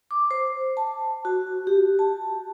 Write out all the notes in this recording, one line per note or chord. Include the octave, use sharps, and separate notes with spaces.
D6
C5
A5
F#4
G4
A5